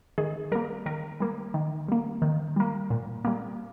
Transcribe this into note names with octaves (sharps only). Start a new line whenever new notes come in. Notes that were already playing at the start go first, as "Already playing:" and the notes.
D#3 G#4
G3 A#3 A#4
D#3 A#4
G3 A#3
D#3
G3 A#3
D#3
G3 A#3
A#2
G3 A#3